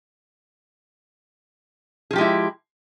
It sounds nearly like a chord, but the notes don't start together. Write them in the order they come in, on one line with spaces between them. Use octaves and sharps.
G#4 F3 G4 G#3 E4